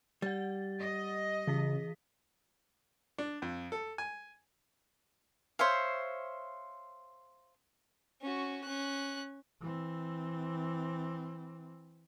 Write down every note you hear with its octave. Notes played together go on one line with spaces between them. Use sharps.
G3 F#5 A6
D#5
C#3 E3 G#4 B6
D4
F2
A4
G#5
C5 C#5 E5 F5
C#4 F#4
C#4 F#6
E3 C4